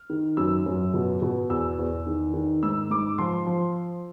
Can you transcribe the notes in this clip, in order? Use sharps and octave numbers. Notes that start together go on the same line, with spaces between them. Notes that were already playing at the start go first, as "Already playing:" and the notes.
Already playing: F6
D#3
F#2 E6
F#2
B2
B2
E2 E6
E2
D#3
D#3
G#2 E6
G#2 D6
F3 C6
F3